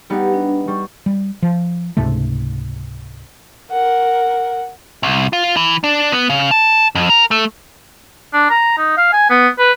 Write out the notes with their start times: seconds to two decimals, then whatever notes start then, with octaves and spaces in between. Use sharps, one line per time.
0.10 G3 B3 D#4 G4
0.34 D4
0.68 G3 C#6
1.06 G3
1.42 F3
1.97 C#2 G#2 C3 A3
3.72 A#4 F#5
5.03 C2
5.33 F4
5.57 E3
5.84 D4
6.12 B3
6.30 C#3
6.51 A5
6.95 F2
7.10 A#4
7.31 A3
8.33 D4
8.50 A#5
8.78 D#4
8.97 F5
9.13 G#5
9.30 B3
9.59 B4